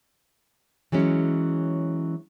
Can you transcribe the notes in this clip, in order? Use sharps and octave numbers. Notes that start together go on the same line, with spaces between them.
E3 F#3 G#3 C#4